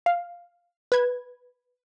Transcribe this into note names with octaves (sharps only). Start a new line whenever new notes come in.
F5
B4 G#6